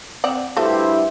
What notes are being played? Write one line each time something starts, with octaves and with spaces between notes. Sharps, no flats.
C4 D5 F#5
G2 A3 E4 F#4 G4 A4 C5